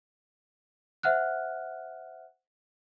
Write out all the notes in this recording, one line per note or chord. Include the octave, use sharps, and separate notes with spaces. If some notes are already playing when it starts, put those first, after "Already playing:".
C5 E5 F#5 F6 F#6